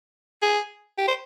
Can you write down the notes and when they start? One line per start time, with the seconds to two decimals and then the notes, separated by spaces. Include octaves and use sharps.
0.42 G#4
0.98 G4
1.08 C5